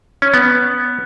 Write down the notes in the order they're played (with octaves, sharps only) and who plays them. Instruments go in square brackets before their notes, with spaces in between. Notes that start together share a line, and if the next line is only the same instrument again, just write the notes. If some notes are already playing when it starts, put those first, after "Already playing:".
[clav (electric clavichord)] C#4
B3